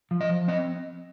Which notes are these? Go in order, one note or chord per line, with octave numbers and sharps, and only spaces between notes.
F3
D#5
F3
C4 D#5